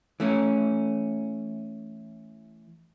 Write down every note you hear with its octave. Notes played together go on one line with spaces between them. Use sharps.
E3 A3 C#4